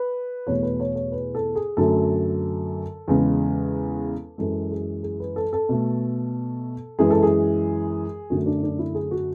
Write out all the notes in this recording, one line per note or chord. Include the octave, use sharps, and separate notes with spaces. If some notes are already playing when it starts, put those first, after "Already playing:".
Already playing: B4
E2 B2 A3 C#5
B4
C#5
C#5
B4
A4
G#4
F#2 D3 F#3 A3 A4
E2 C#3 G#3
F#2 E3 G#3 A4
G#4
G#4
B4
A4
A4
B2 A3
F#2 E3 G#3 G#4
A4
G#4
F#2 D3 A3 F#4
D4
D4
E4
G#4
F#4